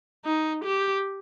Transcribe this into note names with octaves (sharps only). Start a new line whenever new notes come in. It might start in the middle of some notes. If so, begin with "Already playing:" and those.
D#4
G4